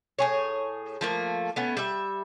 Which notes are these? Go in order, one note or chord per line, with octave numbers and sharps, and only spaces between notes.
A2 G#4 C#5
F3 A3 A#3
A3 B3 C#4
G3 E5